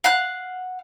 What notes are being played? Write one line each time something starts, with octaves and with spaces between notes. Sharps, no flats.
F5 F#5 F#6